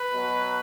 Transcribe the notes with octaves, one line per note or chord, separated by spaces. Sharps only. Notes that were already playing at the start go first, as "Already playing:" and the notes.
Already playing: B4
B2 F#3